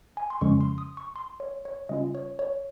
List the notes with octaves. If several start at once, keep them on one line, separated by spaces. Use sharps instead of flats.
G#5
C6
F2 C#3 F3 G#3 C#4 C#6
C6
D#6
C#6
C6
C#5
C#5
C#3 G3 C#4 F4 D#5
C#5
C#5